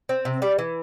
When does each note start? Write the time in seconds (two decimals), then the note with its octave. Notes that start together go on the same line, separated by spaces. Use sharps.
0.09 C4
0.25 C3
0.42 G3 D5
0.59 E3